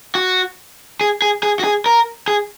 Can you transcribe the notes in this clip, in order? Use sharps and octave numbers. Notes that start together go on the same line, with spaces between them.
F#4
G#4
G#4
G#4
F#4
G#4
A#4
G#4